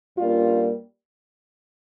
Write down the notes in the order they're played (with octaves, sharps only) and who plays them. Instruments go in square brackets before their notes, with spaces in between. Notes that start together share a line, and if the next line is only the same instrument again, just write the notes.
[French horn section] G2 G3 A#3 C#4 F4